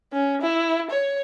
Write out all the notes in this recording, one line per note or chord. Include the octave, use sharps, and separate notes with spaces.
C#4
E4
C#5